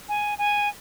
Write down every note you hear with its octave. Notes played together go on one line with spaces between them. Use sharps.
G#5
G#5